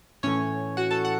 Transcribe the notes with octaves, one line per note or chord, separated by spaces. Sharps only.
A2 E3 A3 C#4 C#5
F#4 F#5
A4 A5
F#5